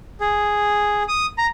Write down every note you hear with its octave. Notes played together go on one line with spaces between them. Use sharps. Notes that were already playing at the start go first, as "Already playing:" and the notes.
G#4
D#6
A#5